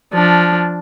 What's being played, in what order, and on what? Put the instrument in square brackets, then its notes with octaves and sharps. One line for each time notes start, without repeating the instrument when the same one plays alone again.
[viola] F3 D4